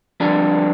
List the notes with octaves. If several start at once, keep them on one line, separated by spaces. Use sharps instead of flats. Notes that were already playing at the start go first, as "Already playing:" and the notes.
F2 D3 G3 D4